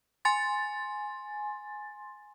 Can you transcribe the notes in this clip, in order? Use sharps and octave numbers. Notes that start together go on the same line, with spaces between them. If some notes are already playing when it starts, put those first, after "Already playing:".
G#5 C6 A6